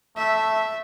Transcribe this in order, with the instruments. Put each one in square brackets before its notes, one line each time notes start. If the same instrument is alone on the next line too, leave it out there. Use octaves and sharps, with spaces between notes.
[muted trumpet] A3 [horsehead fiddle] E5